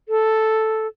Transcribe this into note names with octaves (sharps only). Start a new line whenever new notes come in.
A4